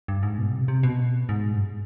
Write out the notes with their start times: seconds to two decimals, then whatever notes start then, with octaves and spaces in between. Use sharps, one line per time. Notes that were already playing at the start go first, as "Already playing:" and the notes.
0.08 G2
0.23 G#2
0.38 B2
0.54 C3
0.68 C3
0.83 B2
1.29 G#2
1.52 G2